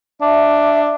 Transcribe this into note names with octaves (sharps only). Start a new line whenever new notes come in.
D4 E5